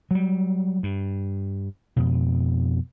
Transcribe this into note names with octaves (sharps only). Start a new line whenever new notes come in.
F#3 G3
G2
F2 B2